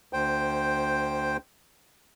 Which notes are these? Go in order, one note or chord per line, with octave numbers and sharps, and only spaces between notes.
D2 C5 G5